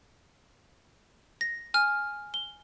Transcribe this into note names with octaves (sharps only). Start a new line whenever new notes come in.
A#6
G#5 F6
G7